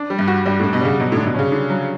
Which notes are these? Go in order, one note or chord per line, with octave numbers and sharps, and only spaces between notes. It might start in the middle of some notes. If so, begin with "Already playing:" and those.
Already playing: D4
G3
G2
F#4
G2 G3
A2 D4
B2
C#3 G3
B2 F#3
A2
D3
B2
C#3 C#4
D3
F#3